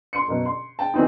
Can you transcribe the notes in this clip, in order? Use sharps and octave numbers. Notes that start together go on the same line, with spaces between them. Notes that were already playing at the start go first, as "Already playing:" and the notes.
C6 C#7
F#1 B2
C6
G5 A5
E3 C4 D#4